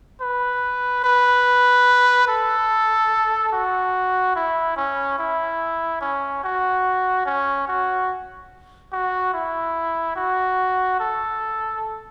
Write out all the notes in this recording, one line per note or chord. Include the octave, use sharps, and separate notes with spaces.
B4
B4
A4
F#4
E4
C#4
E4
C#4
F#4
C#4
F#4
F#4
E4
F#4
A4